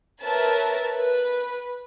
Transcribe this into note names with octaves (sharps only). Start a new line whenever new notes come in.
A#4 B4 C#5 E5 A5
B4